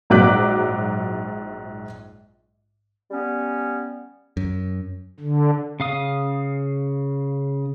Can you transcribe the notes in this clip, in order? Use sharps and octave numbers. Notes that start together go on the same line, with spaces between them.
A#1 G#2 F#3 D6 F#6 B6
G3 B3 C#4
F#2
D3
C#3 F5 D#6